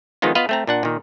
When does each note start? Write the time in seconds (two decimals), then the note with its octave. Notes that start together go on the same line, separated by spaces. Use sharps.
0.22 D#3 F3 G#3 B3 D#4 F4
0.35 B3 F4 B4 D#5 F5
0.49 A3 C4 A#5
0.67 A#2 D4 F#5
0.83 A#2 D#3